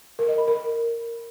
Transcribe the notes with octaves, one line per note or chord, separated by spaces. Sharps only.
A#4
D#5
B5
A#4